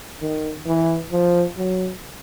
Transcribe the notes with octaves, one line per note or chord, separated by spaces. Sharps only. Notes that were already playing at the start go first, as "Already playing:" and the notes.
D#3
E3
F3
F#3